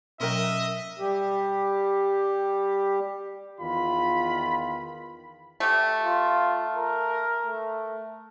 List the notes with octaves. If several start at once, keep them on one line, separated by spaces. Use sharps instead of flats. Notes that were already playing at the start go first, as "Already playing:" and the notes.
B2 F#3 C#4 A#4 D#5 E5 G5
G3 G4
E2 D#3 F4 B5
A3 G4
F4
A#4
A3